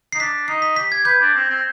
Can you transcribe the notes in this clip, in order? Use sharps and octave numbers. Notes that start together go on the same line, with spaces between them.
D#4 C7
D4 B6
D#4 C7
B6
G4 B6
G#6
B4 G6
D4
C4
C4